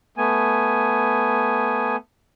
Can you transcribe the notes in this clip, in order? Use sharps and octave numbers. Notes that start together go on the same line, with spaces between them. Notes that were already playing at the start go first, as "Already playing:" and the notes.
A3 B3 G#5